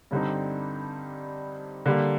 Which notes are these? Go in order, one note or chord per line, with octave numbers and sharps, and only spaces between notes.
G2 D3 G3 C4 D#4
D3 G3 A#3